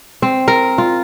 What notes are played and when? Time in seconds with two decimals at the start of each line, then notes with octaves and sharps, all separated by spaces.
0.22 C4
0.48 A#4
0.78 F4